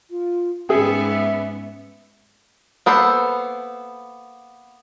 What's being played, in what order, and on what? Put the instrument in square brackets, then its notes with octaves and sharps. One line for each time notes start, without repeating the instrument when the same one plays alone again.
[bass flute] F4
[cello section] G#2 B3 [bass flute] C#4 [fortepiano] G#4 G5 [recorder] E5
[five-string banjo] A#3 B3 A4 C5